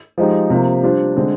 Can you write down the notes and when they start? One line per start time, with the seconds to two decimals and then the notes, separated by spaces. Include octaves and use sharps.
0.18 F3 G#3 D#4 G4
0.50 C3 F3 A#3
0.83 G3 D4 F4 C5
1.16 D3 G#3 C4